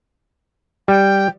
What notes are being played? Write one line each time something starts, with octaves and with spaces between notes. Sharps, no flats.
G3 G5